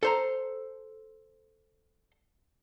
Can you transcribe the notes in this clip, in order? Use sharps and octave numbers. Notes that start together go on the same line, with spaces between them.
A4 C5 A#5